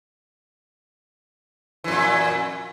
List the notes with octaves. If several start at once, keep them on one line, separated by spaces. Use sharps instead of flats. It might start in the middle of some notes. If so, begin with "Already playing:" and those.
F2 A#2 E3